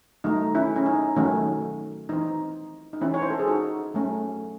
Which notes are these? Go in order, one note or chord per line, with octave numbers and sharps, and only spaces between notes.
D#3 F#3 A3 D#4
C#4 E4
C#4
D#4
D#3 F#3 A3 C#4
E3 C4 D#4
D#4
E3 C4 C#4 E4
C#5
C5
A4
G#4
D#4 F#4
F#3 A3 C#4